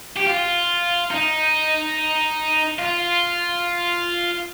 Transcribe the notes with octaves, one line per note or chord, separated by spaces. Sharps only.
G4
F4
D#4
F4